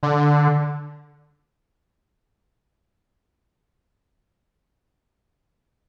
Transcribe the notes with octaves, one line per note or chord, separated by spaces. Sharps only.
D3